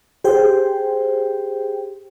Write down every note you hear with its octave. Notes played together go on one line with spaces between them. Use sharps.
G4 G#4 C5 G5